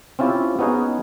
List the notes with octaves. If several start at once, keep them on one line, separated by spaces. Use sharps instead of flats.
C4 C#4 E4 F4 G4
B3 C#4 D#4 F#4 G#4